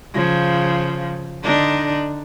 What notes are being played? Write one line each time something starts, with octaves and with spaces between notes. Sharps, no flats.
C#3 F3
D3 D4 D#4